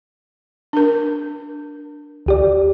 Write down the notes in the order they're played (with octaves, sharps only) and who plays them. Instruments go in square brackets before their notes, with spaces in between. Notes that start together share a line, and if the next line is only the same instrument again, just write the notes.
[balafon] D4 A#4
[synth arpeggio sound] D2 G4 D5